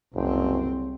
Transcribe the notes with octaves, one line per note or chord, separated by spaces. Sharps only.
F#1 C2 C4